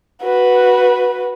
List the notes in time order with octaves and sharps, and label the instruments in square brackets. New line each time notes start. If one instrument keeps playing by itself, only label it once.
[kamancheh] F#4 B4